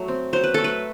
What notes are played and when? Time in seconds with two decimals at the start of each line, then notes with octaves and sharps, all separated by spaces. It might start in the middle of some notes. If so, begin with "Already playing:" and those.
Already playing: F#3 A3
0.08 C4
0.33 F#3 C5
0.44 B4
0.54 A3 A4
0.64 B4